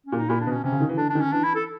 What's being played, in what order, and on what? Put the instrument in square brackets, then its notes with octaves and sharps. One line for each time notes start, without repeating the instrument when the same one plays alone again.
[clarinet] C#4
[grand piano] A#2
[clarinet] D#4
[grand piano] A#2 [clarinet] E4
[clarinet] D4
[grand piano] B2
[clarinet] C#4
[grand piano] C3 [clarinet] C#4
[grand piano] C#3
D#3
E3
[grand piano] D3 [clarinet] D4
[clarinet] D4
[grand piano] D#3
[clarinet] C#4
[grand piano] E3 [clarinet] D4
[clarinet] E4
A4